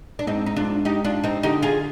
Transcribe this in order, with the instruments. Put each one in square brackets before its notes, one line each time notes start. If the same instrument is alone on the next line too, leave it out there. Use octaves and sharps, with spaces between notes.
[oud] D4
[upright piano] G#2 [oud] C4 D#4
[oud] D#4
[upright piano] G#2 [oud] D4 F4
[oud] D#4 G4
D4 F4
C4 D#4
[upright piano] D3 [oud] D#4 G4
[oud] F4 G#4